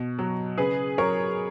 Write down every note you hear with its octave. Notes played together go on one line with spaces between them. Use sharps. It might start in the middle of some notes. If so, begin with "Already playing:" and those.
Already playing: B2
F#3
C#3 G#4 B4
F#3 A#4 C#5